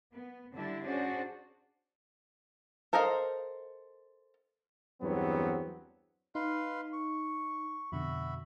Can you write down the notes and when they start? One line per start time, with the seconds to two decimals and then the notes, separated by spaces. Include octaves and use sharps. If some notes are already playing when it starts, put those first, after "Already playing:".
0.12 B3
0.54 D3 G3 D4 E4
0.83 C#4 D4 F#4 G#4 C5 D5
2.93 A4 A#4 C5 D#5 F5
5.01 E2 G2 F#3 B3 C4
6.35 D#4 B4 F5 C6
6.93 C#6
7.92 F2 B2 D3 F#4 E5 B5